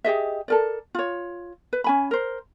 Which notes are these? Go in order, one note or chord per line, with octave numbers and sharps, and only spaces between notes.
G4 G#4 D#5 E5
A4 A#4 D5
F4 C#5
B4
C#4 G#5 B5
A#4 C5